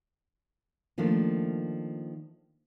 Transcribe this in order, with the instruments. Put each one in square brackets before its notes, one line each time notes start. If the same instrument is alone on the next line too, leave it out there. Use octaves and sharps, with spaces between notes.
[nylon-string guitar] D#3 F3 A3 A#3 D4